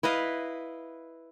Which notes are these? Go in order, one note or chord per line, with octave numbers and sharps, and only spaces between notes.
E4 B4 D#5 F5